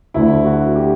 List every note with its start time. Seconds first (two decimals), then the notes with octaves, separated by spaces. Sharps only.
0.14 D2 D3 E4
0.45 F#4
0.75 G4